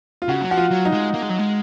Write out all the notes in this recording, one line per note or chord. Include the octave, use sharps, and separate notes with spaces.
F4
C#3 F#4
F#3
F3 F#4
F4
F#3
D#4
G#3
A#3
G#3
F#3
G#3